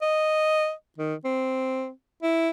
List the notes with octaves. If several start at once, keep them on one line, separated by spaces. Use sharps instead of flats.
D#5
D#3
C4
E4